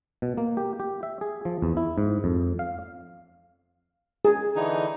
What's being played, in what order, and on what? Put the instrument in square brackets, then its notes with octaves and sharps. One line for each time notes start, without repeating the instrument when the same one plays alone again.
[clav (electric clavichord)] B2
A#3
G4
G4
E5
G#4
F3
E2
E4
G#2
F2
F5
[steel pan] G#4
[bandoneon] D3 E3 D#4